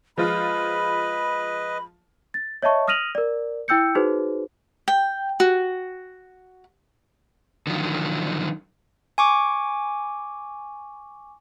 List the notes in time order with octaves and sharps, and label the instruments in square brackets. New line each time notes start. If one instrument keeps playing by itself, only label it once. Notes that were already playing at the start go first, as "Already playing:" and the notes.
[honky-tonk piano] F3 G#3 F4 [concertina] B4 D#5 [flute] B5
[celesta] A6
C#5 D#5 E5 A5 C#6
D#6 F6 A#6 D#7 F7 F#7
A#4 D5
E4 G5 E6 G6 C#7
D#4 F#4 G#4 B4 C5
[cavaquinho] G5
F#4
[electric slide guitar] D3 D#3 F3 F#3
[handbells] G#5 C#6 D6